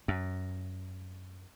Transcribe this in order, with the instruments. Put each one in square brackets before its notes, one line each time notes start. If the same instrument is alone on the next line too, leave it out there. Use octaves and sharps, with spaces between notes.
[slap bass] F#2